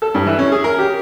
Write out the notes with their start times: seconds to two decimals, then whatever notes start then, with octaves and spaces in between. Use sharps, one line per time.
0.02 A4
0.14 G2
0.26 E3
0.39 C#4
0.52 G#4
0.64 A#4
0.78 G4